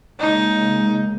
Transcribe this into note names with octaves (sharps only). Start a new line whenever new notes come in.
C#3 G#3 A#3 D#4